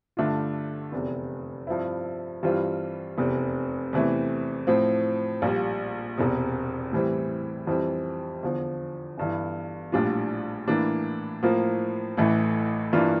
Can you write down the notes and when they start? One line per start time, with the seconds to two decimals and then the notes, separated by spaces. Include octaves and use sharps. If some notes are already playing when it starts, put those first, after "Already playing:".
0.17 G2 D3 A3 D4 F4
0.92 F1 E2 C3
1.67 G2 F3 C4 E4
2.43 G2 E3 G3 C4 F4
3.18 F1 E2 C3
3.93 E2 C3 E3 A3
4.67 A2 F3 C4
5.42 A#1 A#2 G3
6.18 E1 E2 C3
6.92 A2 E3 G3 C4
7.67 F2 E3 G3 C4
8.43 E2 D3 F3
9.18 G1 G2 E3
9.92 A#1 A2 G3 D4 F4
10.68 A2 E3 A#3 D4
11.42 A2 F3 A#3 F4
12.17 A1 A2 E3 A3
12.93 G2 E3 A#3 D4 F4